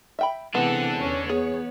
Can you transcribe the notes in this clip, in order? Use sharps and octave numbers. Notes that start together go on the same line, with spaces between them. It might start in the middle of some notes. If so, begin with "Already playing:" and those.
E5 G5 B5
C3 E3 G#3 B3 C4 D4 A4 F#5
E2 C#4 C#5
B3 G#4